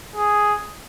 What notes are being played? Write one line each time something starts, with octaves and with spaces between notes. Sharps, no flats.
G#4